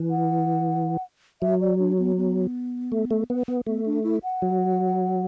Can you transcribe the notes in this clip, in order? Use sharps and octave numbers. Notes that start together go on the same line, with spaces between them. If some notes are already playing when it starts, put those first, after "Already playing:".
Already playing: E3
F#5
F#3 E5
D5
D4
B3
B3
A3
A3
B3
B3
A3 B3
D4
E4
F#5
F#3